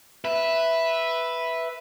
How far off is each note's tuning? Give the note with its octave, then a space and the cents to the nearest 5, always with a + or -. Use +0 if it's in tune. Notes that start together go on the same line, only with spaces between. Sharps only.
B4 +0 E5 +0